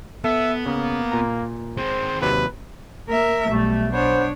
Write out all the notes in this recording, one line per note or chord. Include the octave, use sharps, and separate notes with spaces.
B3 A4 E5
C#3 A#3
A#2 A#5
G#3 C4 C5
D#2 C3 F#3 B4
A#3 A#4 E5
B1 G3 A3
B3 D4 C5 C#5